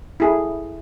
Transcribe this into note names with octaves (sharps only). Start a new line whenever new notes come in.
E4 G#4 A4